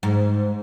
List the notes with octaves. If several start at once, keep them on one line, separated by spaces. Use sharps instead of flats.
G#2